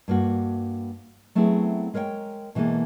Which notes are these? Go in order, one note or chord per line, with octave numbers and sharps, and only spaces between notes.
G2 A#3 F#4
F#3 A3 B3 C4 E4 G#4
G#3 A#4 C#5 F#5 G5
B2 E3 G#3 A#3 A4